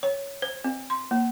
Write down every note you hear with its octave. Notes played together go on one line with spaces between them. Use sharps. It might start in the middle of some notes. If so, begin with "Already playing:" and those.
C#5
C5
C4
C6
A#3